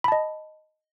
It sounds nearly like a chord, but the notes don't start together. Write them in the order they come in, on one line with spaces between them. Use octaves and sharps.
B5 A5 D#5